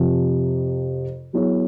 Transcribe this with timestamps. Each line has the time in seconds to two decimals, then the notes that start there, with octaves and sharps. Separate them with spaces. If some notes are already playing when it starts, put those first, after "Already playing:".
Already playing: F2 C3 F3
1.33 F#3 B3 E4 G#4 C#5